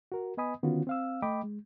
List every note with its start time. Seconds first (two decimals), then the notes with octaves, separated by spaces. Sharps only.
0.12 F#4 A#4
0.37 B3 B4 D#5 G#5 B5 D#6
0.63 D3 D#3 B3 C#4 F4 F#4
0.87 C4 F5 E6
1.22 A3 D#5 G5 B5 D6
1.44 G#3